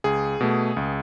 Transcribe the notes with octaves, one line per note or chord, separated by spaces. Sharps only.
C#2 G#4
B2 A3
C#2